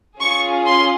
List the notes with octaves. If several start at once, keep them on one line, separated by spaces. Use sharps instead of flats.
C#4 F4 G#4 C#6
C6